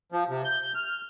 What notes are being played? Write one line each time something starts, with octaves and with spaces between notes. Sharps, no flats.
F3
C3
G6
F6